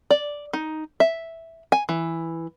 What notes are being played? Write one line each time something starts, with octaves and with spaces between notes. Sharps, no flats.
D5
D#4
E5
G#5
E3